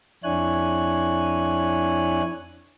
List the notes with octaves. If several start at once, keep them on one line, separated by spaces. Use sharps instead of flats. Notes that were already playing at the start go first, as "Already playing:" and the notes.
F2 D4 E4 C#5 G#5 F#6